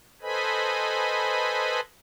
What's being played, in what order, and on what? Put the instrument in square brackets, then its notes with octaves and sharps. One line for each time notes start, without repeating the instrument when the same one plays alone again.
[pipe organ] A4 B4 C5 D#5 G#5 B5